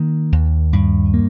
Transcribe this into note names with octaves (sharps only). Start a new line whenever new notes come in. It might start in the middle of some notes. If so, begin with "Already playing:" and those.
Already playing: D#3 A#3
D#2
G2
A#3